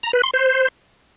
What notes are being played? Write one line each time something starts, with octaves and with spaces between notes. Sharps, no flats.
A#5
B4
C6
C5